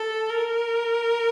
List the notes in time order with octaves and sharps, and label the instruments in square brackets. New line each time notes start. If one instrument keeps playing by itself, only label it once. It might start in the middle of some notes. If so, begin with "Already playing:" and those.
Already playing: [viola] A4
A#4